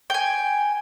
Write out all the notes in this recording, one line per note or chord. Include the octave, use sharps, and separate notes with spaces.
G5 G#5